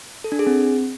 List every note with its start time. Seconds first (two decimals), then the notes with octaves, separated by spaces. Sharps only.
0.24 A4
0.32 D4
0.39 G#4
0.47 C4